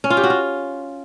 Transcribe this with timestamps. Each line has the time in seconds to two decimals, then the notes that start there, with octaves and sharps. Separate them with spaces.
0.04 C#4
0.10 F4
0.17 G4
0.23 F#4
0.30 F4